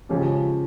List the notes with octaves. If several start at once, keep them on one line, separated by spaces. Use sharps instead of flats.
C#3 F3 G#3 C#4 G4